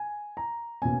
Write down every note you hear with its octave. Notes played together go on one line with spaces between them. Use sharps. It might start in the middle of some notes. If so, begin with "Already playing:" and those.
Already playing: G#5
A#5
B2 A#3 C#4 G#5